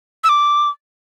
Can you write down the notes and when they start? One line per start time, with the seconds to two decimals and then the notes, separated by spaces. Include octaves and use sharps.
0.24 E6
0.29 D6